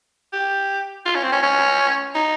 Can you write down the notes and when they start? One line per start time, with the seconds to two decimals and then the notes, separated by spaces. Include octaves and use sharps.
0.33 G4
1.06 F4
1.15 C#4
1.23 C4
1.32 C#4
1.42 C#4
2.15 D#4